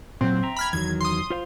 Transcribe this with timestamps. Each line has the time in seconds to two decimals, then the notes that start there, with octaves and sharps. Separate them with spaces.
0.21 A#2 F#3 C4
0.43 E5 G5 A#5
0.57 B5 F6 G#6
0.73 E2 D#3 F#3 G#6
1.01 C6 D#6
1.30 F4 C5 F5